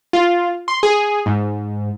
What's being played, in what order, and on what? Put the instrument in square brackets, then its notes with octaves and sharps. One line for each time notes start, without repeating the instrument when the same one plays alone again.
[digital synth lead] F4
C6
G#4
G#2